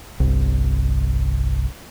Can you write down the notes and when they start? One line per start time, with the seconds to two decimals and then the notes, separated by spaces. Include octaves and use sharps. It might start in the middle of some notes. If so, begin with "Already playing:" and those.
0.20 G1 C2